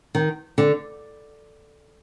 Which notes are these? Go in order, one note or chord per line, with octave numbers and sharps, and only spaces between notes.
D#3
D3